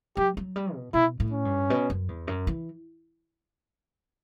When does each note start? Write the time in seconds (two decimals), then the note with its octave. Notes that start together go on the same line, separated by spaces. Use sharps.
0.17 F#3 G4
0.37 F#3
0.56 G3
0.74 B2
0.94 B2 E4
1.20 A2
1.32 C#4
1.45 G2
1.70 B2
1.90 F#2
2.08 E2
2.27 F#2
2.47 E3